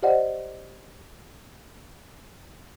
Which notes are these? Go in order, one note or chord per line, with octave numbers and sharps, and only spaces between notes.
G4 C5 D5 D#5 F#5